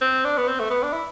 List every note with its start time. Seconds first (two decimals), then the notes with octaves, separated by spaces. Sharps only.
0.01 C4
0.25 D4
0.37 B3
0.48 C4
0.60 A3
0.70 B3
0.83 D4
0.93 E4